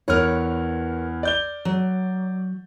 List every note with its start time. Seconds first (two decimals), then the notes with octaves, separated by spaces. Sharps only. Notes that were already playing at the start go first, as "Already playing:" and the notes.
0.08 E2 A#4 B4 C#5 F6
1.23 D5 G6 G7
1.65 F#3